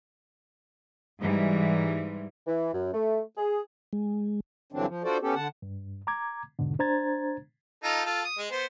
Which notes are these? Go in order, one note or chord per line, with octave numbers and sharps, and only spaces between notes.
G#2 E3 G3
E3
F#2
A3
G#4
G#3
G2 D3 E3 F#3 C4 D4
F3
D4 F4 F#4 A4 C5 D5
B3 C#4 G4 A4
D3 F#5 A5
G2
A#5 D6 G#6
E2 G#2 B2 D3
D4 C5 A#5 G#6 A6
D#4 F4 A4
F4 A4
D#6
G#3
B3 C5